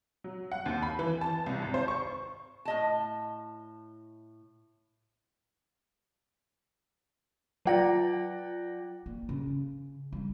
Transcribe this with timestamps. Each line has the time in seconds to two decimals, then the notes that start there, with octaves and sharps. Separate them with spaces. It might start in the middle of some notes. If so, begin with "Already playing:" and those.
0.24 F#3
0.52 F#5
0.66 D#2
0.82 B5
0.99 E3
1.21 A5
1.46 C2
1.62 G#1
1.74 C5
1.88 C#6
2.65 A2 D#5 A5
7.65 F#3 F4 D5 F#5 G5 A#6
9.06 A#3
9.29 C#3
10.12 G3